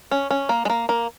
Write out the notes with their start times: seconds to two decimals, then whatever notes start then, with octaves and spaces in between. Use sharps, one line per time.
0.11 C#4
0.31 C#4
0.49 A#3
0.65 G#3
0.70 A#3
0.89 A#3